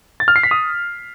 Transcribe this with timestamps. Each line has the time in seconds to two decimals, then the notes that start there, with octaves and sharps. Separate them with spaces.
0.20 A6
0.28 F6
0.36 C7
0.43 B6
0.51 D#6